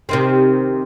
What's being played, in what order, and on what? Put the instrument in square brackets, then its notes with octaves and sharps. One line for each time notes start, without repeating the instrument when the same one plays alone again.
[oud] C3 D#3 C4